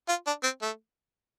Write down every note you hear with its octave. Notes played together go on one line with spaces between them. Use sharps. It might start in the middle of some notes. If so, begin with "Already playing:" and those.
F4
D4
C4
A3